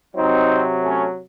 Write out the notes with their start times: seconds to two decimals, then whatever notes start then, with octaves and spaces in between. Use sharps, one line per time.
0.16 C3 F#3 C4 D#4
0.83 A3 C#4